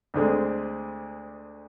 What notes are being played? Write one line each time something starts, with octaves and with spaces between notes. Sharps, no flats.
D2 D3 G#3 C4